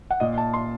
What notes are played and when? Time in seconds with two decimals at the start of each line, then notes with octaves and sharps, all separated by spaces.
0.11 F#5
0.20 A#2 D#5
0.38 A5
0.53 C6